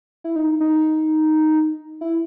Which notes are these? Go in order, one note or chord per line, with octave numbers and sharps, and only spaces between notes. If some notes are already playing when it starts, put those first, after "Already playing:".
E4
D#4
D#4
E4